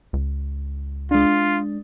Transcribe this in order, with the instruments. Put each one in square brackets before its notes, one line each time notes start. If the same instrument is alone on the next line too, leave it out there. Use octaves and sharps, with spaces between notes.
[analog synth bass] C#2
[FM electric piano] G#3 D4 [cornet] F4